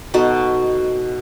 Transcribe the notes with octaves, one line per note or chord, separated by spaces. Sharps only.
B2 D#4 F#4 A4